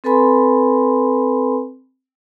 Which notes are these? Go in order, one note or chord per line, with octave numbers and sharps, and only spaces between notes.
C4 A4 B4 G#5 B5 C6